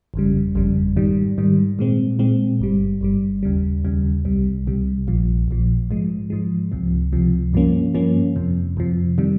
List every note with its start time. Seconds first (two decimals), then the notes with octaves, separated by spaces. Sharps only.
0.14 G1 F2 C#3 G3
0.55 G1 F2 C#3 G3
0.96 G#2 D#3 G3
1.38 G#2 D#3 G3
1.79 A#2 G#3 C4
2.19 A#2 G#3 C4
2.60 G1 G2 G3
3.01 G1 G2 G3
3.43 D#2 C#3 G3
3.85 D#2 C#3 G3
4.25 C2 C3 G3
4.66 C2 C3 G3
5.07 A#1 A#2 F3
5.48 A#1 A#2 F3
5.90 G#2 F3 G#3
6.30 G#2 F3 G#3
6.72 C#2 C3 F3
7.12 C#2 C3 F3
7.53 G2 F3 A#3 C#4
7.94 G2 F3 A#3 C#4
8.36 F2 C3 F3
8.77 F2 C3 F3
9.18 C3 D#3 G3